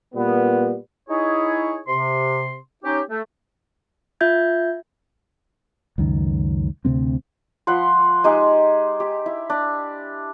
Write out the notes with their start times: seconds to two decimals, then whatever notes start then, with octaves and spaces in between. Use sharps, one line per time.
0.15 A#2 G3 B3
1.09 D#4 E4 G#4 C#5
1.88 C3 C6
2.84 C#4 D#4 G4
3.10 A3
4.21 F4 E5 G6 G#6
5.98 C#2 F#2 D#3
6.85 D2 C3 A#3 C4
7.67 F3 F#5 B5 C6
8.24 G#3 D#4 G4 G#4
9.00 G4
9.26 E4
9.50 D4